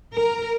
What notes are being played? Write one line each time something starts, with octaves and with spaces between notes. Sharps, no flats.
A#4